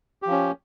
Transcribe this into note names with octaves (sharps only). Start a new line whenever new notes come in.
F3 C#4 G4